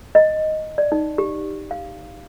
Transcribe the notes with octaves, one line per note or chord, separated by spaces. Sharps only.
D#5
D5
D#4
G4
F5